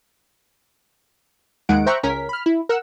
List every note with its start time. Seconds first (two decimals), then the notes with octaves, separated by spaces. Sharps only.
1.69 D#2 D#3 G#3 F#5 D7
1.86 C5 E5 G5 A#5 C#6 F#6
2.03 C#2 C#4 A#4 B6
2.29 B5 F6
2.46 E4
2.69 A#4 F#5 E6